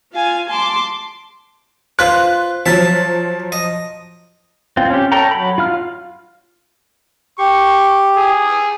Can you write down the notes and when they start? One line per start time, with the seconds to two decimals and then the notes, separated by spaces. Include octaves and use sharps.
0.12 F4 F5 G#5
0.49 A5 C6 D6
1.99 F4 B4 C5 F#6
2.66 F3 F#3 E5 A5
3.52 D#5
4.77 C4 F4
4.90 C#4 G4
5.12 A4 C#5 G5 A#5
5.31 F#3 B5
5.58 F4 F5 F6
7.38 G4 C#6
8.17 G#4